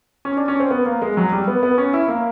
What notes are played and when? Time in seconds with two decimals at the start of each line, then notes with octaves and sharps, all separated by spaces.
0.25 C#4
0.37 D4
0.48 C#4
0.60 C4
0.71 B3
0.86 A#3
1.02 G#3
1.17 F#3
1.32 G3
1.48 B3
1.63 B3
1.78 C#4
1.93 E4
2.08 A#3